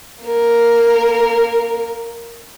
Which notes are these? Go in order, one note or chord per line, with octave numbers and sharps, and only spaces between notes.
A#3 A#4